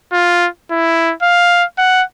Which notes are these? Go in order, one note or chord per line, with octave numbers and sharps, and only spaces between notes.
F4
E4
F5
F#5